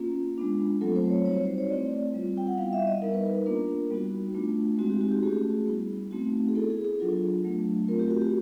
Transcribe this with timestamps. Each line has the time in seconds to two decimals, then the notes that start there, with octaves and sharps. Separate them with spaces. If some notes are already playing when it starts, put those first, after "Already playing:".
Already playing: A#3 C#4 F4
0.37 G#3 B3 D4 F4
0.81 F#3 A3 C4 F4 A4
0.95 C5
1.10 C#5
1.25 G3 C4 D#4 F#4 C#5
1.36 C5
1.47 C5
1.58 C#5
1.69 A3 C4 E4 D5
2.14 G3 C4 F4
2.37 G5
2.47 F#5
2.57 G3 B3 E4 F5
2.73 E5
2.87 D#5
3.02 G3 B3 D#4 A#4
3.14 B4
3.26 A#4
3.46 A#3 D4 F4 A#4
3.91 G3 B3 D#4 F#4
4.35 A3 D4 F4
4.78 G#3 C4 D#4 F#4
4.90 G4
5.01 F#4
5.12 G4
5.23 A3 C#4 F#4 G#4
5.67 G3 B3 E4
6.11 A3 C4 D#4 F#4
6.49 G#4
6.55 B3 E4 A4
6.70 G#4
6.85 G#4
7.00 F#3 B3 D4 F4 A4
7.44 F#3 A3 D4
7.88 A3 C4 F4 A#4
7.99 G4
8.10 F#4
8.21 G4